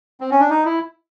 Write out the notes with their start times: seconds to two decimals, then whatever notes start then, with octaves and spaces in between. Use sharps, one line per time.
0.20 C4
0.31 C#4
0.40 D4
0.50 D#4
0.65 E4